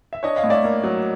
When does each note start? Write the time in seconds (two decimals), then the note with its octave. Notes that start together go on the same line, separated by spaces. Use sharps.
0.13 E5
0.23 D4 C#5 D#5
0.36 D#5 F5
0.44 A2
0.50 D5 E5
0.64 A#3
0.84 F#3